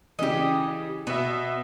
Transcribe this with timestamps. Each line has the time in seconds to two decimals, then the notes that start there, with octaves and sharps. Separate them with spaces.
0.19 C#3 E3 G4 D#5
1.07 B2 B3 E5